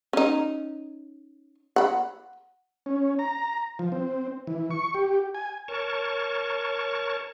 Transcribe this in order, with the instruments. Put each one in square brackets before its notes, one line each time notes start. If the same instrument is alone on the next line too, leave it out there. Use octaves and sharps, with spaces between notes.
[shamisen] C#4 D#4
F#5 B5
[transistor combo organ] C#4
A#5
F3
C4
E3
C#6
G4
G#5
[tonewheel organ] A#4 C#5 A5 C#6